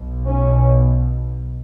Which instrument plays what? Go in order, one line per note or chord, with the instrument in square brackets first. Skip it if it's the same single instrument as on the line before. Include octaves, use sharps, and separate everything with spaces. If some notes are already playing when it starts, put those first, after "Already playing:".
Already playing: [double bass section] B1 B2
C#4